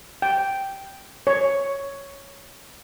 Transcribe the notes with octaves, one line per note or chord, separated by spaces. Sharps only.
G5
C#5